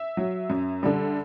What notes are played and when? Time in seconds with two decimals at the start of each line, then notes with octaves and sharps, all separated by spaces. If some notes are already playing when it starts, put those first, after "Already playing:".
Already playing: E5
0.17 F#3
0.50 F#2
0.83 D3 G3